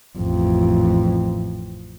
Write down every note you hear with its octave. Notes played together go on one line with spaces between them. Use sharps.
A1 F2